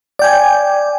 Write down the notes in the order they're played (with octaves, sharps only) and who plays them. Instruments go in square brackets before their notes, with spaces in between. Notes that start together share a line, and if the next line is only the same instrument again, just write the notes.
[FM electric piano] D5 G5 G#5